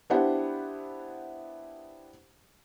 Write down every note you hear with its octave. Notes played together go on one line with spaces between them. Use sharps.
B3 D4 E4 G4 C5 F#5